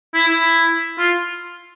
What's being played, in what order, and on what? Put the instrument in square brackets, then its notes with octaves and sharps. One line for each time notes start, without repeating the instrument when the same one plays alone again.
[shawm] E4
E4
F4